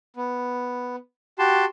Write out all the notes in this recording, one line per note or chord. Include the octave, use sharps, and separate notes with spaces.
B3
F#4 G4 A5 C6